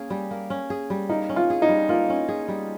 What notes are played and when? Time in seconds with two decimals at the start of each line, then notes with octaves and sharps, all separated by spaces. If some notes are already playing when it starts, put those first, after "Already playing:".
Already playing: A#3 C#4 G#4
0.10 G3
0.31 A#3
0.50 C#4
0.70 G#4
0.90 G3
1.09 A#3 D#4
1.29 C#4
1.36 F4
1.50 G#4
1.62 D#4
1.69 G3
1.89 A#3 F4
2.10 C#4
2.29 G#4
2.48 G3